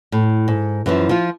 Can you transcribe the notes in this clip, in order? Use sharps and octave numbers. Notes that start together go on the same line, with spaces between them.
A2
G#2
F#2 E3 F3
F3 F4